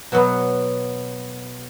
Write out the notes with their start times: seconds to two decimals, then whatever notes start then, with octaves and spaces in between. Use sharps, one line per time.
0.12 B2 F#3 B3